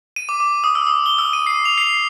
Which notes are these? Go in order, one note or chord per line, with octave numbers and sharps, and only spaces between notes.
D#7
D6
D6
D#6
E6
D#6
G7
E6
D#7
C7
F7
C7